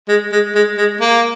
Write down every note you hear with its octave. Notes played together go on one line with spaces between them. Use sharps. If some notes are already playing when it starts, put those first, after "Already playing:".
G#3
G#3
G#3
G#3
A#3